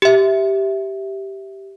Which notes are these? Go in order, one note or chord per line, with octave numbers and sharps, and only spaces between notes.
G4 E5